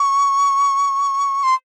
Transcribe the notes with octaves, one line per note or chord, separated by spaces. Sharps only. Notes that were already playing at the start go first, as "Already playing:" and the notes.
Already playing: C#6
C6